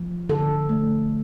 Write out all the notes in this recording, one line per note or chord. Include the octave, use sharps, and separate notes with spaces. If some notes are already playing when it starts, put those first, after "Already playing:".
Already playing: F3
D3 A4
A3